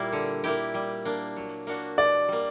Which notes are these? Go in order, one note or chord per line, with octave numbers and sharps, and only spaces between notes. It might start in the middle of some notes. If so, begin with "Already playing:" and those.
Already playing: A#2 G3 A#3 E4
D3
A#3 E4 G4
G3
A#3 D4
F#3
A#3 D4 F#4
B2 D5
G3 A#3